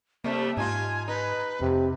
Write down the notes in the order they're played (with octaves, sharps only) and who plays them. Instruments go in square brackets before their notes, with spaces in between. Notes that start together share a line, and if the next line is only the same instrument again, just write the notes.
[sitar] C3 G3 A3 [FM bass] A#3 [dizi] E5
[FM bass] G#2 [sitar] D#4 F4 [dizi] G#5
[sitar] D#4 [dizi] B4
[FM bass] F2 [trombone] C3